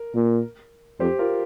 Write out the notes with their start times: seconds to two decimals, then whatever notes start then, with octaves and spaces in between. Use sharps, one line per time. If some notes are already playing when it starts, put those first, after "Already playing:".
Already playing: A#4
0.15 A#2
1.00 F2 G4 C5
1.19 F4 A#4